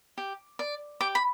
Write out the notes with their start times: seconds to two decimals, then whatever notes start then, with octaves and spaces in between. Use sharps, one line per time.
0.18 G4
0.59 D5
1.01 G4 D6
1.15 B5